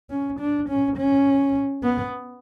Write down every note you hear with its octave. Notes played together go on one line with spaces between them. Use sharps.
C#4
D4
C#4
C#4
B3